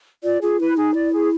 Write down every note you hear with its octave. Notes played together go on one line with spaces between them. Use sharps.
F4 D5
F4 G#4
E4 B4
D#4 G#4
E4 D5
G#4